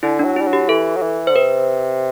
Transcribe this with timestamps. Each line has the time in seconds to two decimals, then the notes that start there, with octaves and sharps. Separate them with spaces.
0.03 D3 E4
0.19 D4
0.25 F#3
0.36 G3 E4
0.47 F#3
0.53 G4
0.69 E3 A4
0.97 F#3
1.02 E3
1.27 D3 C5
1.36 C3 B4